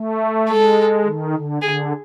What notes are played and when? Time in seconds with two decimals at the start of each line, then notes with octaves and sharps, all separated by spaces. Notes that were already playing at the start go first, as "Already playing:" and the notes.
Already playing: A3
0.48 G#3 A4
1.05 D#3
1.35 D3
1.62 D3 G#4